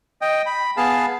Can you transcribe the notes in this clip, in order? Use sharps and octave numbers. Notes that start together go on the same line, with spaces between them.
D#5 G5
B5
B3 G#4 F5 A5